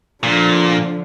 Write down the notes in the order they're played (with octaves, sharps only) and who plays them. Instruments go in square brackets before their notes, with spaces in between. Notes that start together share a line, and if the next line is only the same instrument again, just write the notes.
[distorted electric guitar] A#2 [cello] D3 F3